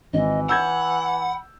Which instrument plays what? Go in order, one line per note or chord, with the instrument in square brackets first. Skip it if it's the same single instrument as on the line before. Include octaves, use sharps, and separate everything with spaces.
[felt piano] G#1 [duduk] E3 [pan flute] D#5
[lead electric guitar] F#5 [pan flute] B5 [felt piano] E6 G6 G#6